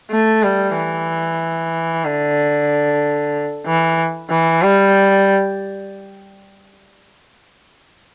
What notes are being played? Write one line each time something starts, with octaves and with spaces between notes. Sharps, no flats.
A3
G3
E3
D3
E3
E3
G3